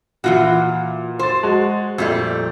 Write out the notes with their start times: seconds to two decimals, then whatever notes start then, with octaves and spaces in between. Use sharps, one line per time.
0.24 A#2 E3 F4 F#4
1.19 C5 C6 A6
1.43 G#3 F#4
1.98 F2 A#2 G3 A3